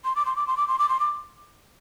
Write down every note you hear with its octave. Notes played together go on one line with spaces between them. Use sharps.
C6
D6
C6
D6
C6
D6
C6
D6
C6
D6